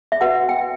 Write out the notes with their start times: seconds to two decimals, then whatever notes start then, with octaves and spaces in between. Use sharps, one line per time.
0.12 E5
0.21 F#4 B4 F#5
0.49 G5